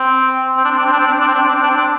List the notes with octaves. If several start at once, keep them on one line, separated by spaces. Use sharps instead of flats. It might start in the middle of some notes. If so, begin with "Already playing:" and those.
Already playing: C4
C4
D4
C4
D4
C4
D4
C4
D4
C4
D4
C4
D4
C4
D4
C4
D4
C4
D4